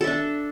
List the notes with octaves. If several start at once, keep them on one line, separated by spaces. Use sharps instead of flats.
D4 A4 E5